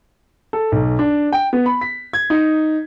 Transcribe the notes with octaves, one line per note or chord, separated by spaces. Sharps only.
A4
B1
D4
G5
B3
B5
B6
G#6
D#4